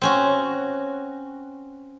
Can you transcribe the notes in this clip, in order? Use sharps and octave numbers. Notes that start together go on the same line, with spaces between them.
C4 C#4 F#4